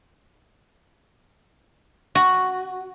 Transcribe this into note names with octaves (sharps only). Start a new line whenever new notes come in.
F#4